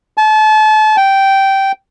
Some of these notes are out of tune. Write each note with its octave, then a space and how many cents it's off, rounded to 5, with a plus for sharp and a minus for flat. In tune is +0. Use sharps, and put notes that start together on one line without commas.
A5 -35
G5 -10